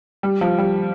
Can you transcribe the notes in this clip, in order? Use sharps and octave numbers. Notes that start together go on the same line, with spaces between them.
G3
F3
G3